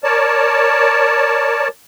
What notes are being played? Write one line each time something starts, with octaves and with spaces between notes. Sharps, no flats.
A#4 C#5 D5 A5